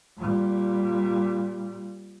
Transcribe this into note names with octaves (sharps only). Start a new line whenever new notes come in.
A#2 G3